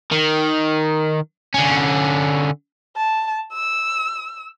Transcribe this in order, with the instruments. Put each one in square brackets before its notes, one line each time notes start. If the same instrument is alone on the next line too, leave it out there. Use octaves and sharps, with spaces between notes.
[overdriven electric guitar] D#3
D3 C#4
[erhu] A5
E6